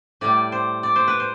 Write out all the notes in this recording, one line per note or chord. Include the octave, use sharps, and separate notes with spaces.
A2 G3 D5
C5
D5
C5
B4
C5